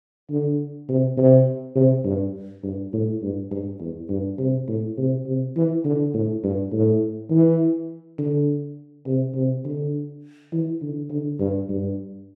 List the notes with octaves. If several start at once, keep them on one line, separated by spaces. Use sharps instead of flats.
D3
C3
C3
C3
G2
G2
A2
G2
G2
E2
G2
C3
A2
C3
C3
E3
D3
A2
G2
A2
E3
D3
C3
C3
D3
E3
D3
D3
G2
G2